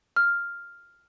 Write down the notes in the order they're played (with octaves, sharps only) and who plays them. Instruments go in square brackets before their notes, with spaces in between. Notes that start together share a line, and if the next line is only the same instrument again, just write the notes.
[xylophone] F6